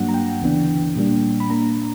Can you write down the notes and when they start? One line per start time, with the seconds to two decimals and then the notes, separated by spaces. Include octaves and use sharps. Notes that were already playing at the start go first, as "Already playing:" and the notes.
Already playing: G2 F#3 A#3 D4 F#5
0.09 A#5
0.14 G5
0.42 D2 C#3 E3 B3 D4
0.95 A#2 G3 A#3 D4
1.40 B5
1.50 A#2 A#3 D4 A#5